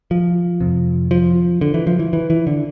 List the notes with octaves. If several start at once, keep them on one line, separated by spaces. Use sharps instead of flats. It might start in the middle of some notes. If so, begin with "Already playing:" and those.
F3
F2 C3
F3
D3
E3
F3
E3
E3
E3
D3